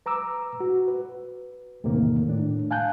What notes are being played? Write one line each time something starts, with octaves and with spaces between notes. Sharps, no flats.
B4 A#5 D6 E6
F#4
B4
E2 A2 C3 D#3 A#3
A2 D4
F5 G#5 A5 F#6 G6